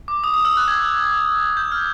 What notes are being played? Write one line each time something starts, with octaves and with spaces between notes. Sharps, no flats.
D6
D#6
D#6
E6
F#6
G#6
G6
F6